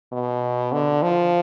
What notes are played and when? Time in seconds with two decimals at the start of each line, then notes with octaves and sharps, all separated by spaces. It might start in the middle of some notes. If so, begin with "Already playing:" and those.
0.12 B2
0.72 D3
1.02 F3